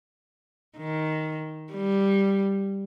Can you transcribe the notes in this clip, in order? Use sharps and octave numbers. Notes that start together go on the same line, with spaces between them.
D#3
G3